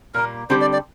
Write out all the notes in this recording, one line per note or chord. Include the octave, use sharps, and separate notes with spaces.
A#2 G3 A#3 A#4
D3 G3 C4 G4 C5
D5
D5